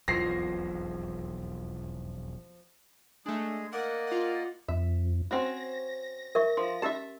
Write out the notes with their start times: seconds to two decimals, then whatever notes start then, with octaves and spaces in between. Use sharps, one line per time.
0.08 E1 B1 F2 F3 A#6 C7
3.26 G#3 A3 D4 G#4
3.73 A#3 A#4 D5 D#5 F#5
4.07 F4 F#5
4.68 F2 E5
5.31 C4 C#4 F#4 A#6
6.35 A#4 E5 C#6
6.57 F3 C6
6.82 C#4 G4 E5 A5 E6